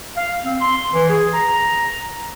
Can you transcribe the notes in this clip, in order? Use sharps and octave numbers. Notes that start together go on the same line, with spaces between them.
F5
C4
C6
E3
G#4
A#5